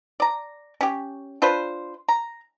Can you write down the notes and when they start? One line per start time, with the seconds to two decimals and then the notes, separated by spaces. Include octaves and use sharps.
0.20 D5 A#5
0.81 C#4 G4
1.42 D4 F4 B4 C5
2.09 A#5